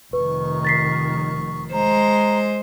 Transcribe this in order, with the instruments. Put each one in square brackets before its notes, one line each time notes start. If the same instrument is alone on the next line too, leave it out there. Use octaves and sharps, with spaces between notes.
[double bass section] F1 D#3 [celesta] B4 [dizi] C#6
[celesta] A6 B6 C7
[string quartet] G#3 C5 [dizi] A#5